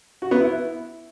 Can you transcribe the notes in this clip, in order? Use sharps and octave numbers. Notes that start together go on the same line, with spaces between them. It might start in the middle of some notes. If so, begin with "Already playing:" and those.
F#4
B3
E4